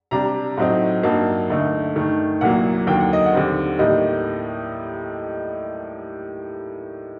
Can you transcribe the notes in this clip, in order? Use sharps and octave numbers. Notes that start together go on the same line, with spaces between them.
C3 G3 D4 A#5
A2 F#3 C4 D#4
G2 F#3 A#3 D#4 A5
D2 D3 A3 D#4
G2 D#3 A3
C2 A#2 F#3 A#3 F#5
D#2 D3 F#3 A#3 G5
F#5
D#5
F#5
D#2 D3 G3 C4
A2 G3 A#3 D#4 D#5